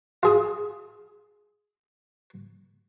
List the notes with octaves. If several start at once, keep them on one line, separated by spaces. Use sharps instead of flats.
F4 G#4 D#6